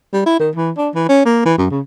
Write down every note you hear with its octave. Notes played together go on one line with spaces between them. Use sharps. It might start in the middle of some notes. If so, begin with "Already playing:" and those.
G3
E4
D#3
E3
D4
E3
C#4
A#3
E3
F#2
C#3